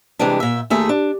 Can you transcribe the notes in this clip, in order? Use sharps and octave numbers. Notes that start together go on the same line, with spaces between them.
C3 E3 G3 G#3 D4
A#2 E5
D#2 A3 G#4 E5
D4